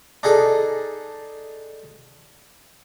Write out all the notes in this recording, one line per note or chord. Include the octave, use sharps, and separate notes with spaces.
D4 D#4 G#4 A4